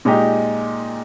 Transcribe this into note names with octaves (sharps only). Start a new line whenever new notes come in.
A#2 G#3 D#4 G4